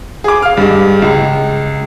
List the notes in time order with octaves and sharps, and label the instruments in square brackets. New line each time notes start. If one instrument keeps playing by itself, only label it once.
[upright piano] G#4 D6
F5 F6
G2 G#3
C#2